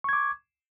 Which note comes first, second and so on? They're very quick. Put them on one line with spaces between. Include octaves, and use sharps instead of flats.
C#6 G#6 D6